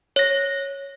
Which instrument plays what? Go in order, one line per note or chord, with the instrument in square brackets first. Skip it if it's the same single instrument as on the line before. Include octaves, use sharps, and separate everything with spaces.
[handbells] C#5 A#6